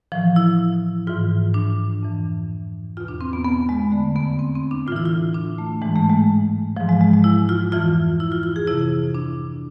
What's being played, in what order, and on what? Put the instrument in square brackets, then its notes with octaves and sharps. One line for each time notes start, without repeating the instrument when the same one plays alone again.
[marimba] A2 E3 F3
E4
G#2 E3 F4
D4
F2 E3
E2 B2 F4
D4
C4
B3
B3
G#3
D3 A3
F2
B3
C4
C4
D4
A2 F4
E3 E4
F4
D4
A3
G#2 E3 G#3
A3
G#3
G#2 E3 F3
G#3
G#3
G#3
E4
F4
F2 E3 F4
E4
F4
F4
G#4
F2 C3 E3 E4
D4